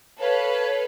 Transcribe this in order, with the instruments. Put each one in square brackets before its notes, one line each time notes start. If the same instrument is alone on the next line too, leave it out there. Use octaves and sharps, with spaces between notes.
[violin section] A4 B4 F5 [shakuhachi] C#5